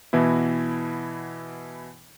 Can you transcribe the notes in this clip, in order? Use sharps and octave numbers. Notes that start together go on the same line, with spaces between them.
B2 E3 B3 E4